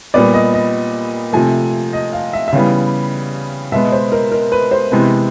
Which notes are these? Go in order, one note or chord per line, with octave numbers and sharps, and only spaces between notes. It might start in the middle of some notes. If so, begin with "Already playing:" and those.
A#2 G3 B3 D5
D#5
D#5
C3 F3 A3 G#5
D#5
F5
E5
E5
C#3 E3 G3 B3 F5
B2 G#3 B3 E5
C5
A#4
A#4
B4
C5
C3 E3 G#3 B3